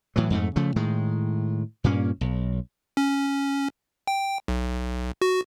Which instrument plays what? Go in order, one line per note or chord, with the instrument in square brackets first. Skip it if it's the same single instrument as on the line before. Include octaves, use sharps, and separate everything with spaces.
[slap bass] A2 E3 F#3
F2 G#2 A3
C#3 F3 A3
A2 D#3 G#3
G2 A#2 A#3 C#4
B1
[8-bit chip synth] C#4
G5
B1
F#4